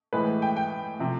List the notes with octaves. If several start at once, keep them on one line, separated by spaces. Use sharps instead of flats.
A2 E3 G#3 B4
G5
G5
C3 F3